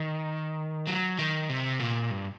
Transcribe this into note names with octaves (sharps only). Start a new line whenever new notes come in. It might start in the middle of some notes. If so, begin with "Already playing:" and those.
Already playing: D#3
F#3
D#3
C3
A#2
G2